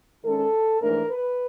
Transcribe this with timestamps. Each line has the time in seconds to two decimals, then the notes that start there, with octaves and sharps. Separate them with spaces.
0.25 D#3 G#3 C#4 A4
0.81 G#2 E3 A3 D4 A#4
1.10 B4